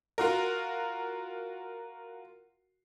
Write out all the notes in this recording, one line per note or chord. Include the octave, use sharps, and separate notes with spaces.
F4 F#4 A#4